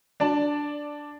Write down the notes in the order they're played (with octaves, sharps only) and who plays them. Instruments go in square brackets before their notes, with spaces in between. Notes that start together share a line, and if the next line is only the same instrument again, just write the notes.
[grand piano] D4 D5 A5